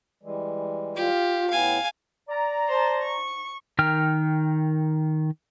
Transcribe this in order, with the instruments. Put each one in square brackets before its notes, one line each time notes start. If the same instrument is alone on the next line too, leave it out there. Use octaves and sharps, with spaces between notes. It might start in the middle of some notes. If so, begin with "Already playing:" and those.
[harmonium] E3 G3 G#3
[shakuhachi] F4 [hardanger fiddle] G4
[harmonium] A2 B3 G5 [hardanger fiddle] F5 G#5
[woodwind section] D5 A#5
[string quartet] C5 A5
C#6
[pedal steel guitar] D#3 A#4 G5 F6